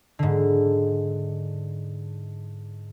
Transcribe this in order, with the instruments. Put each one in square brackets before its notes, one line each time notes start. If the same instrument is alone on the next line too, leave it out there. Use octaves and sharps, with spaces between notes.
[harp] G#2 D3